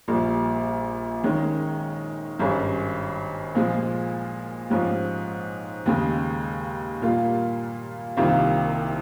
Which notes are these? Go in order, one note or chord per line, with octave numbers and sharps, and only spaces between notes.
A#1 A#2 G3
D#3 G#3 C#4
G#1 G2 G3 C#4 G#4
A#2 F3 G#3
G#2 F3 G#3 C#4 G4
D#2 C#3 G#3
A#2 G3 A#3 F4
C2 C3 D#3 A#3 F4